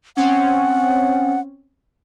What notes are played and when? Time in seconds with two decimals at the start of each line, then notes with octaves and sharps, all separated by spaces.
0.17 C4 C#4 F#5